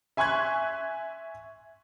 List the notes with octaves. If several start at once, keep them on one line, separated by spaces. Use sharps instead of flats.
E5 G#5 C6 C#6 F#6 G#6